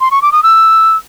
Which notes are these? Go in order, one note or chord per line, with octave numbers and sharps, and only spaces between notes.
C6
C#6
D6
D#6
E6